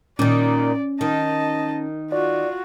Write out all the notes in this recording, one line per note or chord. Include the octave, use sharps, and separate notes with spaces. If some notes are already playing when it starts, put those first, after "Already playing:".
A#2 D#3 C#4 D5
D#3 D#5 A5
F4 F#4 D5